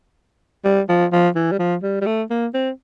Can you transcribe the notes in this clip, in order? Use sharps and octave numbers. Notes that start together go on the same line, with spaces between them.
G3
F3
F3
E3
G3
F3
G3
G3
A3
A#3
C4